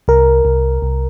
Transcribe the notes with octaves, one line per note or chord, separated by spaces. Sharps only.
C2 A#4
C2
C2